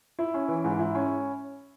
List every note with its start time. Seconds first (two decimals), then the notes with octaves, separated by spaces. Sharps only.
0.19 E4
0.34 C#4
0.48 E3
0.64 G#2
0.79 E4
0.95 C#4